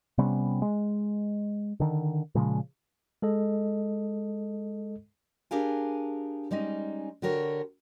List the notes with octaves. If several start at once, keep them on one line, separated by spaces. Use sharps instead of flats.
C3 G3 B3 C#4
G#3
D3 D#3
A#2 C#3 F3 G#3
G#3 A4 D#5
D4 G4 G#4 A#4 F5 G#5
G3 G#3 C#4 D#4
D3 F#4 G4 A#4 C#5